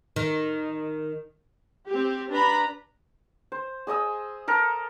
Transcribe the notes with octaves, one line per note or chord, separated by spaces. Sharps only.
D#3
C4 G4
D4 B4 A#5 B5
C5
G#4 D#5 D#6 E6
A4 A#4 A#5